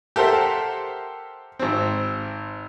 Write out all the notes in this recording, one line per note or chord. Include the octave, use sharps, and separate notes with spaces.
G4 A4 A#4 C5 E5 F#5
G#1 C4